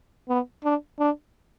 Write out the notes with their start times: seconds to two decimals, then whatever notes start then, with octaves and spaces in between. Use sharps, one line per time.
0.29 B3
0.64 D4
0.99 D4